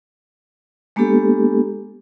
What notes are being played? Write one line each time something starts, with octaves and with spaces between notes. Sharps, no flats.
G#3 A#3 B3 D4 G4 A4